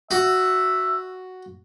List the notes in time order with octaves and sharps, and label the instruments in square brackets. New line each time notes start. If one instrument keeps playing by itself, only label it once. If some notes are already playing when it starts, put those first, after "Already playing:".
[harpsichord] F#4 [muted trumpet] E5